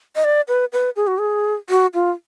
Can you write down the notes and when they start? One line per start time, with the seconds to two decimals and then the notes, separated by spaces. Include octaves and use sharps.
0.16 D#5
0.24 D5
0.48 B4
0.73 B4
0.96 G#4
1.07 F#4
1.18 G#4
1.70 F#4
1.94 F4